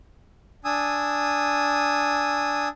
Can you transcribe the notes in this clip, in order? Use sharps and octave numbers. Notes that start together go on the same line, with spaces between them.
D4 G#5 D#6 E6